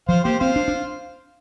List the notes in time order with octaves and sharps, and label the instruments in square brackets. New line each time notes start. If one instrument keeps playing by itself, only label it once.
[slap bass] F3 [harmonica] C5 F5
[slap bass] A#3 [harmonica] G4 C5
[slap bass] C4 [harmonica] C5 F5
[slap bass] D4
D4